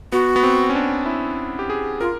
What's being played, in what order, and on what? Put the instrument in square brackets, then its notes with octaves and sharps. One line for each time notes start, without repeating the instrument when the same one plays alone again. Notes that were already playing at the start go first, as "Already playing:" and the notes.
[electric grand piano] B3 [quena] F#4
[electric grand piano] B3
C4
C#4
D4
E4
G4
G#4
[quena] F4 [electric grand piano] A#4